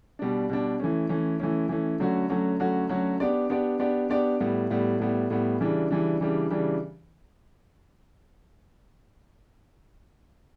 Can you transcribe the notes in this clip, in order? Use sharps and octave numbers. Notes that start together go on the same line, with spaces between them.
B2 G3 D4
B2 G3 D4
E3 A3 C#4
E3 A3 C#4
E3 A3 C#4
E3 A3 C#4
D3 F#3 A3 C#4 F#4
D3 F#3 A3 C#4 F#4
D3 F#3 A3 C#4 F#4
D3 F#3 A3 C#4 F#4
B3 D4 G4 D5
B3 D4 G4 D5
B3 D4 G4 D5
B3 D4 G4 D5
A2 G3 B3
A2 G3 B3
A2 G3 B3
A2 G3 B3
C#3 E3 G3 D4
C#3 E3 G3 D4
C#3 E3 G3 D4
C#3 E3 G3 D4